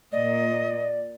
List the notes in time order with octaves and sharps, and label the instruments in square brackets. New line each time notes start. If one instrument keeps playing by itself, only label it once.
[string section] A#2 [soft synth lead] D5 [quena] D#5